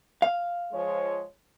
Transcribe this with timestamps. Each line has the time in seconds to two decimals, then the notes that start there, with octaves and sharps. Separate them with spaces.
0.22 F5
0.71 F3 G#3 C#5